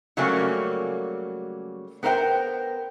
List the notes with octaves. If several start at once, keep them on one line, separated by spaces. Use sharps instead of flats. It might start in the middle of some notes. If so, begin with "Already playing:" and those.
C#3 F#3 G3 A3 A#3 C#4
B3 A#4 C5 F5 G5